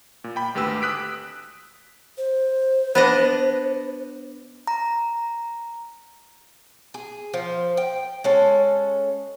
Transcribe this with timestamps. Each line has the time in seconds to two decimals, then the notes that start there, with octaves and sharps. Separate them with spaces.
0.24 A#2
0.36 G5 B5
0.55 G#1 D2 G4 B4 E6
0.82 D#6 F#6 B6 D7
2.18 C5
2.95 B3 D4 D#5
4.67 A#5
6.94 G#4
7.33 F3
7.77 G5
8.24 G#3 C#4 A4